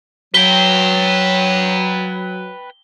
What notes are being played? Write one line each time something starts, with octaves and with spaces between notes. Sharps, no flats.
F#3 B4 G5 G7